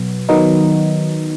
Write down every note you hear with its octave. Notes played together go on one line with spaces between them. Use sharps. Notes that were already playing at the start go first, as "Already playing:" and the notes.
Already playing: B2 F#3 B3
D#3 F#3 B3 D#4